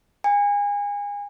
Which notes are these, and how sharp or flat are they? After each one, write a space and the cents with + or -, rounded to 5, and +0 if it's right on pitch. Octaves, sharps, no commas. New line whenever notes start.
G#5 -30